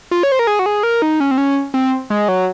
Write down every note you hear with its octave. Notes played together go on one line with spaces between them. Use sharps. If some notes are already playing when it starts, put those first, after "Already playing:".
F4
C#5
C5
A#4
G#4
F#4
G#4
A#4
D#4
C#4
C4
C#4
C4
G#3
F#3